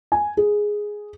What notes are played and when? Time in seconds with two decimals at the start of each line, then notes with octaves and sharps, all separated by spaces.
0.12 G#5
0.37 G#4